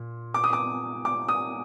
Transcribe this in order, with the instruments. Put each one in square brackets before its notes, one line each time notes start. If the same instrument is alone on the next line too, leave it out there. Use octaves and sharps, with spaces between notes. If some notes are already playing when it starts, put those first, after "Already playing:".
Already playing: [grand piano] A#2
[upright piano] D6
D#6
D6
D6
D#6